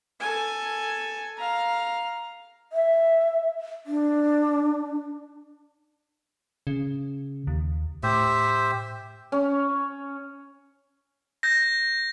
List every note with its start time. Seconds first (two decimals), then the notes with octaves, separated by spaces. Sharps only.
0.20 A4 G#5
1.37 F5 A#5
2.73 E5
3.86 D4
6.67 C#3
7.47 D#2
8.03 A2 G4 C5 E5
9.32 C#4
11.43 G6 A#6